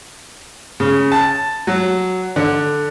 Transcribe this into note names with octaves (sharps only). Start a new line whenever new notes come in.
C#3
A5
F#3
D3